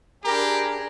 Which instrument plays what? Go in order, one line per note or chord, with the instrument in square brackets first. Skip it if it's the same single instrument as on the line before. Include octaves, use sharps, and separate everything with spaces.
[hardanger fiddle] D4 G#4 [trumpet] G4 [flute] A#4 [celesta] A#5 B5